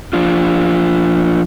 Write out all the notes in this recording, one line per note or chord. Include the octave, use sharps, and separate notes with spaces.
F3 D4 F4